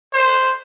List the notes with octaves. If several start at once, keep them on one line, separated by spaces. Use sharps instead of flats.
C5